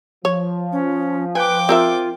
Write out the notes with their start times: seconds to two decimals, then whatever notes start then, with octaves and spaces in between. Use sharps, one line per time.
0.25 F3 C#5
0.72 C#4
1.35 B4 G5 G#5 D6
1.69 C4 F4 A#4 E5